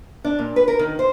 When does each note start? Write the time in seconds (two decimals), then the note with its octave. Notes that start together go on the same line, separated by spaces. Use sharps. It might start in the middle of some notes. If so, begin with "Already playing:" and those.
0.24 D4
0.39 A#2
0.56 B4
0.68 A#4
0.79 D#3
0.99 C5